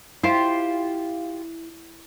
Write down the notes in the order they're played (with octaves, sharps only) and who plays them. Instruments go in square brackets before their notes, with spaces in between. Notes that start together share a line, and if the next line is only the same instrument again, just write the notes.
[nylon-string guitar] E4 [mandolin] F4 G4 C5